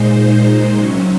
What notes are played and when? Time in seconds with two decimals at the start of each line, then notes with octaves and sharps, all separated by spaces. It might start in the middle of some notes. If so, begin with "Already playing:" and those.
Already playing: A#2 G#3 D#4 C5
0.18 C5
0.75 C3 F#3 C#4 F#4